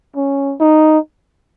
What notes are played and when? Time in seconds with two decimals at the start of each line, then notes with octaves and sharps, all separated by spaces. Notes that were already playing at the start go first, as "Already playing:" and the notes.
0.16 C#4
0.60 D#4